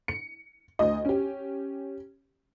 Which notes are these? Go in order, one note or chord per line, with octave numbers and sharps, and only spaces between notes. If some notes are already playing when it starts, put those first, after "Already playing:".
C#7
D2 D#5
C#4 G4